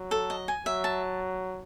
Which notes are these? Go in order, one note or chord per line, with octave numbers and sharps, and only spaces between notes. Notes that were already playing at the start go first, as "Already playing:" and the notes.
Already playing: F#3
A4
D#5
G#5
F#3 E5
A5